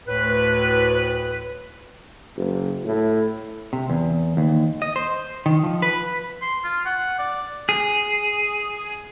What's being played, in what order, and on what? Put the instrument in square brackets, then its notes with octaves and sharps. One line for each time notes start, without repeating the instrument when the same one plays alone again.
[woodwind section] D2 A2 B4
[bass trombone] F#1
A2
[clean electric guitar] C3
E2
D#2
D#5
C5
D#3
F3
B4
[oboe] C6
F4
F#5
D5
[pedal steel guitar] G#4